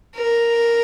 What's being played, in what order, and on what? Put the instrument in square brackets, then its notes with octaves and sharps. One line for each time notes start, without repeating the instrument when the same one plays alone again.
[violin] A#4